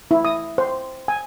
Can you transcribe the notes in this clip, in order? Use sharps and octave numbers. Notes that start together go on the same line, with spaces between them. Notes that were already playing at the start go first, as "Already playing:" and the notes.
E4
D#6
C5
G#5